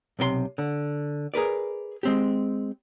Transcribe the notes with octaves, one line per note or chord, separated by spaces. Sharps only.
B1 C3 A#4 C6
D3
G#4 A#4 B4 D5
G#3 C4 G4